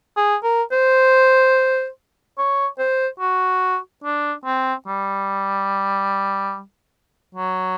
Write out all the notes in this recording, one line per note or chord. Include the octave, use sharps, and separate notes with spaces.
G#4
A#4
C5
C#5
C5
F#4
D4
C4
G3
F#3